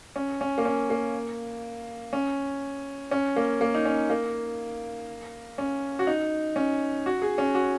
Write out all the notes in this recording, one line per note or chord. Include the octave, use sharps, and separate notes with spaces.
C#4
C#4
A#3
C#4
A#3
C#4
C#4
A#3
A#3
D#4
C#4
A#3
C#4
F#4
D#4
C#4
F#4
G#4
C#4
F#4